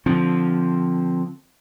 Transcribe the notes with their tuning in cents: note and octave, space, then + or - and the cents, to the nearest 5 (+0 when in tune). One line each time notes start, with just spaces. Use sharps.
D3 +0 F3 +0 C4 +0